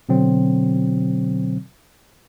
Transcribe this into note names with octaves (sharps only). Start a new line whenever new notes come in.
B2 D3 F#3 C4